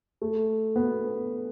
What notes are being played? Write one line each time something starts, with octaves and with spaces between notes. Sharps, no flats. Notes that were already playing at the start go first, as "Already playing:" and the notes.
A3
B3